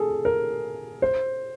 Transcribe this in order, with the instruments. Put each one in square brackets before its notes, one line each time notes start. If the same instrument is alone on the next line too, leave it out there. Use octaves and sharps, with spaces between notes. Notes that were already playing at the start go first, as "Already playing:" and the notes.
Already playing: [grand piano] G#4 A4
A#4
C5